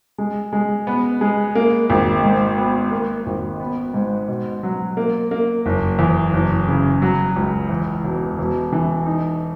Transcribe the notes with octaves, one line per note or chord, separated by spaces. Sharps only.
G#3
G#3
B3
G#3
A#3
G#1
G#2
B3
A#3
G#1
B3
G#2
B2
F#3
A#3
A#3
F#1
E2
F#1
C#3
F#3
C#2
E2
E1
E1
E3
D#4